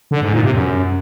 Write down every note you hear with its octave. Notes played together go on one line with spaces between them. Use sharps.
D3
G#2
A#2
C3
F#2